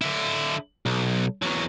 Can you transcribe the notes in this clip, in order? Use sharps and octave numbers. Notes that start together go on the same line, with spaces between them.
D3 E4
B1
E2 F#3